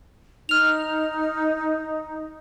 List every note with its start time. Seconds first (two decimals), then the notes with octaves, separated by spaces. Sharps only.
0.49 D#4 F6 F7